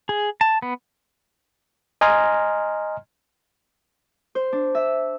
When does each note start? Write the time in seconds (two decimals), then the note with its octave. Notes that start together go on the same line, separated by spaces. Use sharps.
0.09 G#4
0.41 A5
0.62 B3
2.01 D#5 G#5 A#5 C6 F6
4.35 C5
4.53 D4
4.75 E5